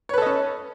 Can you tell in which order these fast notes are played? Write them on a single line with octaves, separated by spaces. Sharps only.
C#5 B4 A4 D#5 C#4